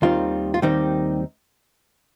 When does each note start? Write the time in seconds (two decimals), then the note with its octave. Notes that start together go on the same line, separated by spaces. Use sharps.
0.02 D#2 D#3 G3 C4 D#4 F4
0.54 F4
0.62 D#2 D#3 G3 C4 D#4 G4